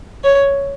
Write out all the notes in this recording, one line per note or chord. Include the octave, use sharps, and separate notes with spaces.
C#5